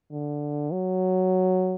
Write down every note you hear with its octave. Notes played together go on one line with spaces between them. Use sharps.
D3
F#3